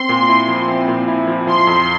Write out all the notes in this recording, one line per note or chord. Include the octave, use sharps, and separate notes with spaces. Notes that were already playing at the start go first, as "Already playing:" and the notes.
Already playing: C4 C6
A#2
E4
F3
C4
A#2
E4
F3
F3 C6
F2